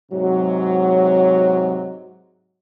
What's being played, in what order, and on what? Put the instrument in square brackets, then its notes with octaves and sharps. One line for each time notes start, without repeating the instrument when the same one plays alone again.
[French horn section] G#2 C3 F#3